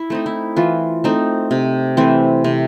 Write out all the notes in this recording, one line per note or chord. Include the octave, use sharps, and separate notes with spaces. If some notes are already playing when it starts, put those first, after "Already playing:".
Already playing: E4
A3 C4 D#4
E4
E3 F4
A3 C4 D#4
C3
E3 A3 C4
C3